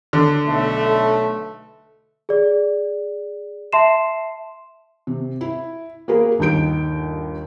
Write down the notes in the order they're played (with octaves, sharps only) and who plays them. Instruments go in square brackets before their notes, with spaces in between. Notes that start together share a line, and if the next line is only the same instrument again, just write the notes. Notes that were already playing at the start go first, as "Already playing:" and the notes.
[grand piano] D3
[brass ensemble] B1 A3
[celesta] G#4 D5
E5 A5 C6 C7 E7
[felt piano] C3
E4
A#3 F#4 G#4 A#4 B4
G1 D#2 D#3 G6 D7